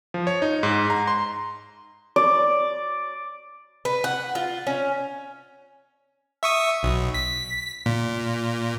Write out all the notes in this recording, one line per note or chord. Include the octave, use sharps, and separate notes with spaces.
F3
C#5
D#4
G#2
A#5
C6
D5
B4
F#5
F4
C#4
E5 C#6 D#6
B1
B6
A#2